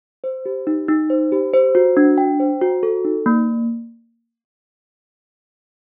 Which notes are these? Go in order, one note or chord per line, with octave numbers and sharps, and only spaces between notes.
C5
G4
D#4
D#4
C5
G4
C5
F#4
D4
G5
C5
F#4
A4
D#4
A#3